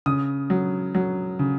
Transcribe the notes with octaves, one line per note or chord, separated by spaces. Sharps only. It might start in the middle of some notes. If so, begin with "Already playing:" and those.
C#3 D#6
F#3
F#3
C#3